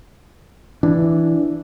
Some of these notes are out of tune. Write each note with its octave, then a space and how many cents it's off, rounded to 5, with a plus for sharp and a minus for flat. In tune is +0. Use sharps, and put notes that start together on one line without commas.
E3 +0 D4 +0